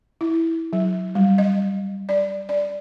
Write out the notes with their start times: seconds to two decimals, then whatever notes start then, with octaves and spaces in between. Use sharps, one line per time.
0.21 E4
0.73 F#3
1.15 G3
1.38 D#5
2.09 D5
2.49 D5